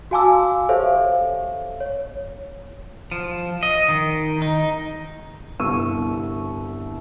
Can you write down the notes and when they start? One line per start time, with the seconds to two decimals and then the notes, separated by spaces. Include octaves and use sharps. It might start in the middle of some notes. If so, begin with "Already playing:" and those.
0.11 F#4 F5 G#5 A5 D6 E6
0.69 G4 A4 C5 C#5 E5 F5
1.80 C#5
3.12 F3
3.63 D#5
3.89 D#3
4.42 D#4
5.60 G1 C2 C#6 E6 D#7